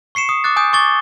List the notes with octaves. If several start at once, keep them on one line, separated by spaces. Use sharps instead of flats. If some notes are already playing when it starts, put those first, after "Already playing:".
C#6 C7 C#7 E7
D#6
D6 D#6 F#6 A6
G#5 D#6 G6
C#6 D6 A6 G7